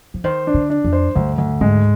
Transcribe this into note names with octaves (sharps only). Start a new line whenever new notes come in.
F3
D#3 C5
D4
D3
D4
F2
C5
D2 G2
D2
G#2 G#3